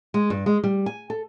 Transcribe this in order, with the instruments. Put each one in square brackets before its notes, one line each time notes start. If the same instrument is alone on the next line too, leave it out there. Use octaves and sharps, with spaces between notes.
[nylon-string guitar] G#3
G2
G#3
G3
G#5
A4